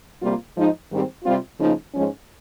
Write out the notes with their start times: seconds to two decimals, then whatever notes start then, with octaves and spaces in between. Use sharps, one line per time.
0.21 C3 G3 A#3 F4
0.55 G#2 F3 G#3 D#4
0.91 G#2 D#3 G3 C4
1.24 C3 G3 C4 F4
1.59 C#3 F3 A#3 D#4
1.94 G#2 F3 G#3 C#4